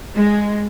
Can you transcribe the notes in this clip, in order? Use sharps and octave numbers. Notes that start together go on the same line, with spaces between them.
G#3